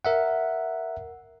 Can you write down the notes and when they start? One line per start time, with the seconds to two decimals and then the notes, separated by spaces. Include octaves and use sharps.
0.05 A#4 E5 F#5